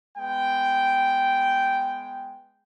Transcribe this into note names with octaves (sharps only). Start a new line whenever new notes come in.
G#3 B3 G5